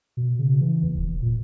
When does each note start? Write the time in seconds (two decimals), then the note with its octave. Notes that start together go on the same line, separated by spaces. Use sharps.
0.17 B2
0.39 C#3
0.61 E3
0.83 D#2
0.98 E1
1.22 A#2